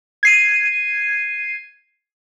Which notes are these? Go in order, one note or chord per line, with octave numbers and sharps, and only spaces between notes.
G#6 C7 D#7